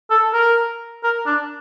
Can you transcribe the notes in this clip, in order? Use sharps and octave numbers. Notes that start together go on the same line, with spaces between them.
A4
A#4
A#4
D4